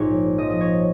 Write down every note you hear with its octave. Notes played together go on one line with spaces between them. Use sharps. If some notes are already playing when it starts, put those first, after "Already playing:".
Already playing: A#1 G#2 C#5
F3 D#5
D#5
C#5